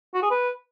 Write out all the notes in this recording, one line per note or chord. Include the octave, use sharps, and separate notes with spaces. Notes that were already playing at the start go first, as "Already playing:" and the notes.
F#4
G#4
B4